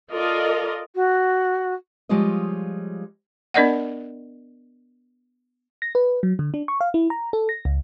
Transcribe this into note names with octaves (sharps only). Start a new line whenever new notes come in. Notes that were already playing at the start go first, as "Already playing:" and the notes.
F4 A4 A#4 D5 D#5
F#4
F3 G3 G#3 F4 C#5 D#5
B3 D4 A#4 D5 D#5 F#5
A#6
B4
F#3
D3
D4
C#6
F5
E4
A#5
A4
A#6
C#2